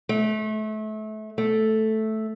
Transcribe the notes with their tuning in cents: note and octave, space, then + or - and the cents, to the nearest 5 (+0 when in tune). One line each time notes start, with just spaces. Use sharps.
A3 -30
A3 -5